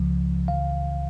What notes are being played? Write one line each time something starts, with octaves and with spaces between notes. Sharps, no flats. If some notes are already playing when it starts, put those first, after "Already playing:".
Already playing: C#2 C#3 F3
C#2 C#3 E3 F5